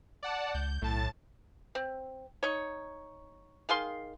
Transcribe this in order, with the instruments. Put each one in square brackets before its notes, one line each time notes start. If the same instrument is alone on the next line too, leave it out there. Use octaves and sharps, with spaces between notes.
[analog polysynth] D5 F#5 A5
[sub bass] C#2 [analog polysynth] G6
[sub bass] B1 [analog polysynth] A2 A5 A6
[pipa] C4
D#4 C#5
D#3 G#4 F5 C6